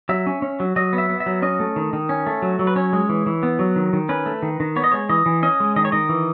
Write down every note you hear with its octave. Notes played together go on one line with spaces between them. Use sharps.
F#3 E5
C#4
C#4
F#3
F#3 D#5
B3
E5
B3
E5
F#3
C#4 D#5
A3
D#3
D#3
C#4
A3
F#3
F#3
B4
C#4 C#5
G#3
E3
E3
B3
F#3
D#3
D#3
C#4 B4
A3
D#3
D#3
B3 C#5
D#5
G#3 C#5
E3 D#5
E3
C#4 D#5
G#3
D#3 D#5
C#5
D#3 D#5
E3